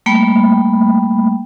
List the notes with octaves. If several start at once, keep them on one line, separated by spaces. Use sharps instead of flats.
G3 A3 A#3 G5 B5